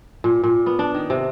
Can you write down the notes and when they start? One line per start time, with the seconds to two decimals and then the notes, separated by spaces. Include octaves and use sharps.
0.24 A#2
0.44 A#2
0.66 B3
0.79 D4
0.95 D#3
1.10 C3